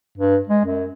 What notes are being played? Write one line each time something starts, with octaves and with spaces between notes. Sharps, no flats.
G2
G#3
F#2